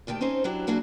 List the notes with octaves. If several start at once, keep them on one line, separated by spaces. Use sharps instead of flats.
D2 D#3 G4 G5 A5
C4 C#4 D#4 A4 C5 G#5
F#3 D4 E4 F#4 G4
F#3 A#3 D4 E4 F#4 G#4